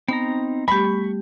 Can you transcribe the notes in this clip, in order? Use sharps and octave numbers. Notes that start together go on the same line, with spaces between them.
B3 C4 D#4 A#5
G3 A3 G4 B5 C#6